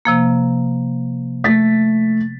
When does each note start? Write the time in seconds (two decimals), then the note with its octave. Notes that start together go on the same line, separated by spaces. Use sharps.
0.05 C3 F3 A#3
1.44 A3 A6 B6